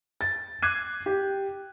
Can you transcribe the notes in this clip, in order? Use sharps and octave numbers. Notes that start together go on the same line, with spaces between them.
A6
D6 F#6 G#6 C7 D#7
G4